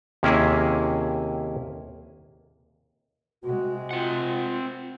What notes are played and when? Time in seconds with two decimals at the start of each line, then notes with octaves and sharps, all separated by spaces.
0.23 D#2 C3 A#3 C#4 E4 G#4
3.43 C3 G#3 F#4
3.91 C4 F4 F#5